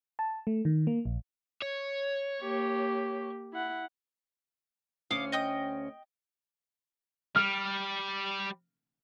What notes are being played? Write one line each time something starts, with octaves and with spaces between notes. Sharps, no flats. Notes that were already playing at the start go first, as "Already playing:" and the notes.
A5
A3
D#3
A#3
A#1
C#5
A#3 G4
E4 F#5
D2 C#4 F5 D6 D#6
D#5 G5 D#6
G3 F6